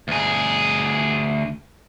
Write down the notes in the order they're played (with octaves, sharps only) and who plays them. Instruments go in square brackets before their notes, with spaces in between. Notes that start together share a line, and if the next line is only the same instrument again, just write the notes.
[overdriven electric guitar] D2 G#4